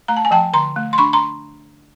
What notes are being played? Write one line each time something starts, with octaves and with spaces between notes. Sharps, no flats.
A3 A#5
A5
G#5
F3 G5 A5
D3 A#5 C6
A3
C6
D4 B5 C#6
A#5 C6